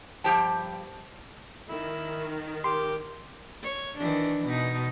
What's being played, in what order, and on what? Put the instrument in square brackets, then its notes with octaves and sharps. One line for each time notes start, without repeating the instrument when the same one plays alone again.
[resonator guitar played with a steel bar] G2 F3 G4 C5 G5 A5
[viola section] D#3 [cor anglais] E4
[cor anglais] G4 [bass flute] A#4 [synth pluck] C6
[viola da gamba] C#5
D#3 E3 D4
B2 D#4